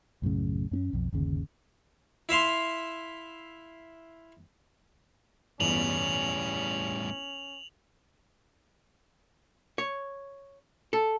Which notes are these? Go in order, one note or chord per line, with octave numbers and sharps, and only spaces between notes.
B1 F#2 A2 C#3
F#2 C4 C#4
B1 F2
G1 D#2 C#3
E4 E5 F5 C6
G1 E2 A2 G3 B3 C#4 F7 F#7
C#5
A4